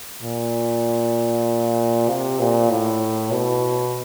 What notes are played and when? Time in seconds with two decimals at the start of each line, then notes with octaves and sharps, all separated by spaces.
0.22 A#2
2.08 C3
2.39 A#2
2.70 A2
3.32 B2